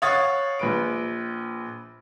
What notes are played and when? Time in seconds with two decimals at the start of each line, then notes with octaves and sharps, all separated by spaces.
0.02 C#5 F5 F#5 D#6 A6
0.59 A#1 B4 D7